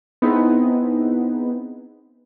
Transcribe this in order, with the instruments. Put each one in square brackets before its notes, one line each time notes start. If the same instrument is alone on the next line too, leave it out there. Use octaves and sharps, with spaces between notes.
[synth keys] B3 C4 D#4 E4 G#4 B4